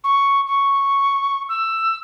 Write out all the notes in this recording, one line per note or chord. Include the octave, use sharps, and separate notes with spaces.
C#6
C#6
E6